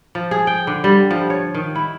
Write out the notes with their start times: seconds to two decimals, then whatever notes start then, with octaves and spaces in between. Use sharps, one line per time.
0.15 F3
0.31 G#4
0.47 G5
0.67 D3
0.84 G3
1.11 F3
1.30 C#5
1.54 D#3
1.75 E4